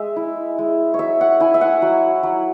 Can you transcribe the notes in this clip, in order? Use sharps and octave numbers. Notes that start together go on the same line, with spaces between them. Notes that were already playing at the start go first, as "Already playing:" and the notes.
Already playing: G#3 E5
E4
G#3
C#5
F#3 E5
F#5
E4 G#5
E5
F#5
F#3
F#3